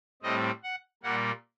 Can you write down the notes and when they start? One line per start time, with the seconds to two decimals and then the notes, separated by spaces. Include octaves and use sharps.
0.22 A2 G3 C4 D#5
0.63 F#5
1.03 A#2 G3 A#3 F#5